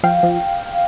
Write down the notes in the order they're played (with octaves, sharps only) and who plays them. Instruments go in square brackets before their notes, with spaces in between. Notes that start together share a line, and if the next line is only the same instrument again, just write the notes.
[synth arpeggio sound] F3 F5 G5
F3